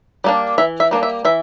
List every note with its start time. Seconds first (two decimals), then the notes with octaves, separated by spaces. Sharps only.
0.24 G3 A#3 D4
0.58 E3 E5
0.80 E5
0.91 G3 A#3 D4
1.03 E5
1.25 E3 E5